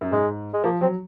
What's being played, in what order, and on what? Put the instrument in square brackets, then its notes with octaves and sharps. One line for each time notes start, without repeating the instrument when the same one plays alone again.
[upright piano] F#2
[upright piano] G#2 [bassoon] G#3
[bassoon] G#3
[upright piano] F3 [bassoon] A#3
[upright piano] F#3 [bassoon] C4